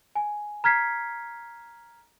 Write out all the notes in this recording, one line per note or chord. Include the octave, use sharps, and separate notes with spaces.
G#5
A#5 F6 G#6 B6 C7